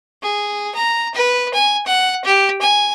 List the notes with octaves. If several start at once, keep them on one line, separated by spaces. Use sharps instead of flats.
G#4
A#5
B4
G#5
F#5
G4
G#5